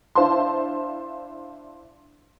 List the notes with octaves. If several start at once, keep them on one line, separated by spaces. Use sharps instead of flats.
D4 E4 C5 F5 A5 C6